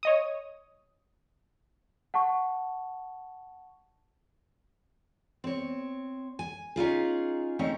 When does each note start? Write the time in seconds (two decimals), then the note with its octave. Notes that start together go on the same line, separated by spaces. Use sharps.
0.03 C#5 D#5 D#6
2.14 F#5 A5 C#6
5.44 C4 C#5
6.39 G#5
6.76 C#4 D#4 F4 G#4
7.59 A3 C4 C#4 D#4